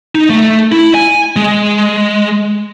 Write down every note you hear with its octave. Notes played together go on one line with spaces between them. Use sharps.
D#4
A3
E4
G#5
G#3